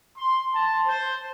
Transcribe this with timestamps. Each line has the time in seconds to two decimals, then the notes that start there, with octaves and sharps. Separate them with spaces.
0.15 C6
0.54 A5
0.86 C5